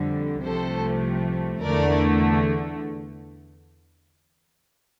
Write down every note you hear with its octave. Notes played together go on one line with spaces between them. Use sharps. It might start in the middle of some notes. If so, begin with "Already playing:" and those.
Already playing: F2 D3 G3
C2 C3 F3 A3 A4 C5
E2 D3 A3 A#4 D5